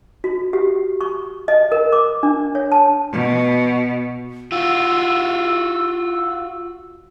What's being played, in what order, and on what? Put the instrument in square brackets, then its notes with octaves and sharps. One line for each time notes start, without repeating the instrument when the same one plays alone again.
[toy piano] F#4
G4
C#6
D#5
A#4
D6
D4
C#5
A5
[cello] B2
[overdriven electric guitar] F4 F#4 [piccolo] E6